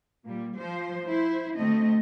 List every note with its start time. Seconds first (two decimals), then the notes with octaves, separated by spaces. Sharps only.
0.24 A#2 G3
0.57 F3 C5
1.06 E4 C5
1.56 D2 A3 C4 D#5